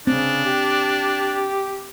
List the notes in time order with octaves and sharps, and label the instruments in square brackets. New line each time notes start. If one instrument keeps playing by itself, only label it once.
[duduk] C#3 [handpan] C4 [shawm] D4
[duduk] G4